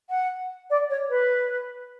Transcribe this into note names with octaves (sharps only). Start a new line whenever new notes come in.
F#5
D5
C#5
B4